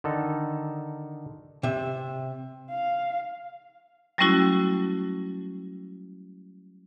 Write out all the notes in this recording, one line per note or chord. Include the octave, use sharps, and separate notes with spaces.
D3 D#3 D#4 A4
C3 E5
F5
F#3 G3 A3 C#4 E4 F#4